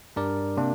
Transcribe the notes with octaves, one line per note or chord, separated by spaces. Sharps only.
G2 G3 D4 A#4 D5
C3 A#3 D4